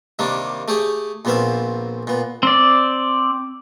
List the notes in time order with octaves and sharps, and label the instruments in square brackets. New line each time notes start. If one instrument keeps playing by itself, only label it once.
[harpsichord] C3 D#3 G3 A#3 D4
A3 G4 G#4 C#5
A#1 A#2 B3 C4 E5 F5
A#2 B3
[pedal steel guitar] C4 D5